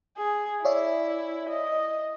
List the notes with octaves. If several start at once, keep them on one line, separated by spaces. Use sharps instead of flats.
G#4
E4 C#5 D5 E5
D#5